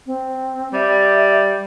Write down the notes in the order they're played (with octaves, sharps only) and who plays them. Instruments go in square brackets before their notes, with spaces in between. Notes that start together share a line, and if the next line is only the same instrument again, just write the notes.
[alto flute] C4
[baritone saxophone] G3 [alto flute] E5